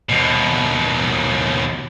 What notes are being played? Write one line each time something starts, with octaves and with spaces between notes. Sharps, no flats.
D#2 B2